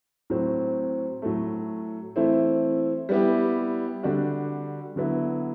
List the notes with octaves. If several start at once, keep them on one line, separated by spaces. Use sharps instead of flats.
A2 F#3 C4
A2 F#3 A3
E3 A3 C4 E4
G3 B3 E4 G4
D3 G3 D4 F#4
D3 F#3 B3 E4